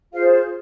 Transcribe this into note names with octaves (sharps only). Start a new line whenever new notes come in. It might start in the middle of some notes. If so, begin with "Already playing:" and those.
F4 G#4 C5 F5